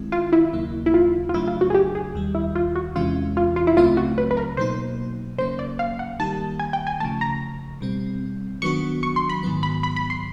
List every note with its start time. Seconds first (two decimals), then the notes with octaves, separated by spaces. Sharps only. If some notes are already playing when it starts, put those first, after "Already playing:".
Already playing: D#3 G#3 C4 E4
0.12 F4
0.32 E4
0.53 D#2 C#3 F#3 A#3
0.86 E4
0.94 F4
1.29 F4
1.34 F2 C#3 F#3 A3 D4 E4
1.48 F4
1.61 F#4
1.70 G#4
1.74 G4
1.95 G#4
2.15 D#2 D#3 G3
2.35 E4
2.55 F4
2.75 F#4
2.96 E2 C3 E3 G#3 C#4 F4
3.37 F4
3.56 F4
3.67 E4
3.77 C#2 C#3 F#3 A3 C4 F4
3.97 F#4
4.18 B4
4.31 B4
4.37 A#4
4.57 B2 F#3 A#3 D#4 C5
5.38 C#3 F#3 A#3 C#4 C5
5.59 D5
5.79 F5
5.99 F#5
6.19 D#3 G3 A#3 D#4 G4 A5
6.59 G#5
6.73 G5
6.87 G#5
7.00 C#3 F3 A3 A5
7.21 A#5
7.81 B2 G3 C4
8.62 D#3 F#3 B3 D4 F#4 C#6
9.03 C#6
9.16 C6
9.29 B5
9.43 G#2 D#3 F#3 B3
9.63 B5
9.83 B5
9.96 B5
10.10 C6